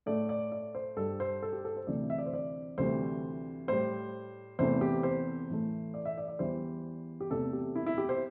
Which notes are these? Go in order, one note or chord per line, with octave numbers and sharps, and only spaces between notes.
A2 A3 D5
D5
D5
C5
G2 G3 A4
C5
A4
G4
A4
C5
D2 C3 E3 A3 D5
E5
D5
C5
D5
D2 C3 E3 G3 C5
A2 G3 C5
E2 C3 E3 A3 C5
G4
C5
A2 E3 A3
D5
E5
D5
D5
E2 E3 G3 C5
G4
E2 C3 A3 A4
G4
E4
E4
G4
C5